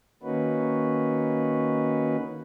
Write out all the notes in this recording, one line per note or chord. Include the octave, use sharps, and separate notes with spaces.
D#3 A#3 C#4 D#4 F#4 B4